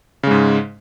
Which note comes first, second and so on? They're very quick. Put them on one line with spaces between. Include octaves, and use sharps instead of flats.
C#3 G#3 G#2